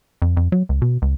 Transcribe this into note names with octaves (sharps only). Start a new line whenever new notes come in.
F2
F2
F#3
C#2
B2
C#2